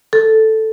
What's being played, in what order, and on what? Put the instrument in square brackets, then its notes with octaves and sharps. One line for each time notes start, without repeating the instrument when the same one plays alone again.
[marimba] A4